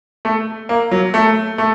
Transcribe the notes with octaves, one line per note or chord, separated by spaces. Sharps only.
A3
A#3
F#3
A3
A3